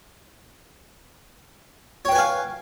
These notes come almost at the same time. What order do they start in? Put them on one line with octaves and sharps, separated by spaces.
C#5 G5 B4 G#5 F5